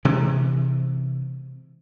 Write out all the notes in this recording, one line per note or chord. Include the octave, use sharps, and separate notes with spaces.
C3 E3 G#3